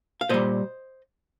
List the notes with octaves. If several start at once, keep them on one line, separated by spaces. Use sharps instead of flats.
F5
A#2 G3 C5 D#5